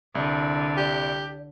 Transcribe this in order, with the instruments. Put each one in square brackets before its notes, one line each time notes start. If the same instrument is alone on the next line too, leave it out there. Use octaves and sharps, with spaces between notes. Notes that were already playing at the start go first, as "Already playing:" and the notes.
[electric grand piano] C2 [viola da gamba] D3
[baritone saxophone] G4 [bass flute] D5